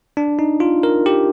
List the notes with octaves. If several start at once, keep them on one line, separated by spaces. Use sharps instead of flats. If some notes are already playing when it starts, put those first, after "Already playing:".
D4
D#4
F4
A#4
G4